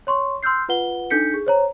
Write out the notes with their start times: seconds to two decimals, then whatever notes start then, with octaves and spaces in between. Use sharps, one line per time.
0.07 C#5 C6 C#6
0.43 C6 E6 F6 G6 C7
0.69 F4 B4 F#5 G7
1.10 D4 D#4 A4 G6 B6 C#7
1.34 G#4
1.46 C5 C#5 A#5